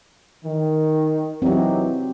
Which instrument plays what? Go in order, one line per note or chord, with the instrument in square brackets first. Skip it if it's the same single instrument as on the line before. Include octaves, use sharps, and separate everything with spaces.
[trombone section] D#3
[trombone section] E3 F#3 D#4 [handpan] C4 G4